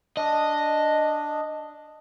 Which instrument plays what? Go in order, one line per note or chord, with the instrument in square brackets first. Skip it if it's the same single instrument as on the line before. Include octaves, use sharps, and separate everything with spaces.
[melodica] D4 [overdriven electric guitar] D#5